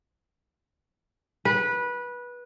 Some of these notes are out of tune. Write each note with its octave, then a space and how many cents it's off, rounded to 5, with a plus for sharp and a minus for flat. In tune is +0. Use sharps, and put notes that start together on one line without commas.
B4 -20